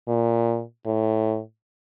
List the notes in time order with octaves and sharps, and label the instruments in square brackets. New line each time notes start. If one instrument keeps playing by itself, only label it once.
[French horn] A#2
A2